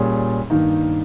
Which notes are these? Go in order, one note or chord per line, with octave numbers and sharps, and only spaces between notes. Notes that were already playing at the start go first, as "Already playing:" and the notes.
Already playing: A#2 G3 C#4 G#4
G2 D#3 A#3 D#4